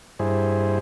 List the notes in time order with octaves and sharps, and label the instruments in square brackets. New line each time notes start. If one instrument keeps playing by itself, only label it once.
[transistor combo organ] G2 E4 G#4 C5